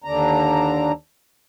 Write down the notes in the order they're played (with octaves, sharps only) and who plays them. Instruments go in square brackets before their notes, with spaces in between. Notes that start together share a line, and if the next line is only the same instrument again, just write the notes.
[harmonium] D#2 D3 D4 A#5